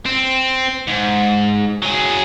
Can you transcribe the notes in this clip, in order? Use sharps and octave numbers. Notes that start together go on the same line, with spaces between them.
C4
G#2
F#3 G#4